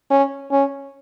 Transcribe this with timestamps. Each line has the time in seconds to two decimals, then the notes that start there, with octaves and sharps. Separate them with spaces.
0.11 C#4
0.52 C#4